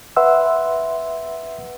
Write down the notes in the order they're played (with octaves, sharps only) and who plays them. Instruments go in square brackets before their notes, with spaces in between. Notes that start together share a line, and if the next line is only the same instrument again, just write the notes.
[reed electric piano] B4 E5 F#5 C6 E6